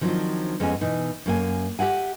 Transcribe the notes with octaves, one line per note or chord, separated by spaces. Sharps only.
D#3 F3 F#3 A#3 C4 D4
F2 G#3 B3 C#4 G#5
B2 E3 D#4
F#2 A#3 G#5
G4 E5 F#5 G#5